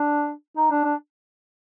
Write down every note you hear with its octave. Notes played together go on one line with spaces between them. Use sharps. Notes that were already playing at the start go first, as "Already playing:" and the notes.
Already playing: D4
D#4
D4
D4